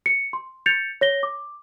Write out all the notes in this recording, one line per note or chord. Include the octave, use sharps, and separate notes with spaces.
C#7
C6
G6 A6 C#7 F7
C#5 A#6 G7
D6